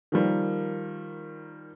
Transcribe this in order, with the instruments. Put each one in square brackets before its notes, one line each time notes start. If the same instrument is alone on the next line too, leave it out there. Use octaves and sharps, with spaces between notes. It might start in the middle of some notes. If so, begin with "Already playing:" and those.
[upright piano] D#3 F3 G3 A#3